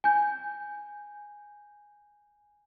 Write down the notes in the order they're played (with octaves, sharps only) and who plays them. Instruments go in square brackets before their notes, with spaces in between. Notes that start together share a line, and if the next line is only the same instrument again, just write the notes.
[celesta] G#5 G6